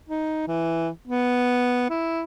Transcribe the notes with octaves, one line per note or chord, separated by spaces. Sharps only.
D#4
E3
B3
E4